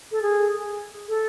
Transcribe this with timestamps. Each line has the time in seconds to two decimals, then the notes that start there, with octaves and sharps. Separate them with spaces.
0.12 A4
0.22 G#4
1.09 A4